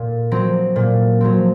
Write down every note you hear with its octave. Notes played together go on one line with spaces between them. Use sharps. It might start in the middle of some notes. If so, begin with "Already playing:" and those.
Already playing: A#2
F#3 C4
A#2
F#3 C4